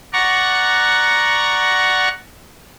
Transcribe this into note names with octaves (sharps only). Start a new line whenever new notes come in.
D5 F#5 A#5 C#6